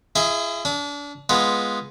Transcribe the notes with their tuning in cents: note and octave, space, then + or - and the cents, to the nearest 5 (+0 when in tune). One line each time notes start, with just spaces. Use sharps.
E4 +45 G#4 +0 E5 -35
D4 -30 D#6 +30
G#3 +0 B3 -10 F4 -10